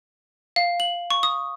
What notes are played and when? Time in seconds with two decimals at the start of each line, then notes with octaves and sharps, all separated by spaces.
0.56 F5
0.80 F#7
1.11 C#6
1.23 D#6